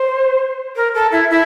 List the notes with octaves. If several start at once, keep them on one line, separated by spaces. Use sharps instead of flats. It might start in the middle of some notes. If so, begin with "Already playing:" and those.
Already playing: C5
A#4
A4
E4
E4